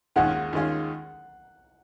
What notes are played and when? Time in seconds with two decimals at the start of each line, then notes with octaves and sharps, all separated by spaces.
0.16 D#2 D#3 G#3 C#4 F4 F#5
0.53 D#2 D#3 G#3 C#4 F4